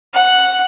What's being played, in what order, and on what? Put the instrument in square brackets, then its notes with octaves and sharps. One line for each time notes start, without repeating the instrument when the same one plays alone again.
[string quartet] F#5